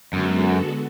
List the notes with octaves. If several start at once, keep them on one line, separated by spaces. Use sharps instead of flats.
F#2 D3 G#3 B3 F#4 A4